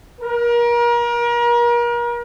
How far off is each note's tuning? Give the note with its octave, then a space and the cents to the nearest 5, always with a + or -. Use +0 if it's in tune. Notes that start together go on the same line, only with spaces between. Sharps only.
A#4 +35